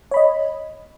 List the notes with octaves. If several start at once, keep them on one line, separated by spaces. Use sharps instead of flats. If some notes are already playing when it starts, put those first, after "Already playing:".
C#5 D#5 B5